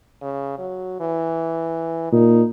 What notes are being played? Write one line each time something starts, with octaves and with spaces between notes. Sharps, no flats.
C#3
F#3
E3
A#2 D#4